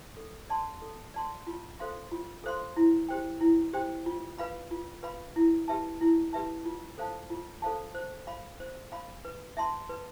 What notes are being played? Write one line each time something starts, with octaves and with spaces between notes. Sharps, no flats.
A4
D5 A5 C6
A4
D5 A5 C6
F4
A4 C5 F5 C6
F4
A4 C5 F5 C6
E4
G4 C5 G5
E4
G4 C5 G5
F4
B4 F5 B5
F4
B4 F5 B5
E4
G4 B4 E5 A5
E4
G4 B4 E5 A5
F4
A4 C5 F5 A5
F4
A4 C5 F5 A5
C5
F5 B5
C5
F5 B5
B4
E5 A5 C6
B4